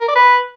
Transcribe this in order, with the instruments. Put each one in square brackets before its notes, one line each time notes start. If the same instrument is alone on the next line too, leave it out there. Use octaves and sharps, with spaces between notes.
[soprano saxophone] A#4
D5
B4